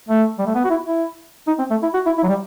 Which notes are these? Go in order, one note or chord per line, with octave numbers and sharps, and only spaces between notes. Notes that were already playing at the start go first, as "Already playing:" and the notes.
A3
G3
A3
B3
F#4
E4
E4
D#4
C4
A3
E4
F#4
E4
E4
F#3
G3